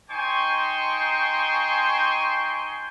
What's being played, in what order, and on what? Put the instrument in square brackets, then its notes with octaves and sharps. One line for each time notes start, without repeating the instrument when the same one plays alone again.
[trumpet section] D#4 C5 G5 G#5 C6 C#6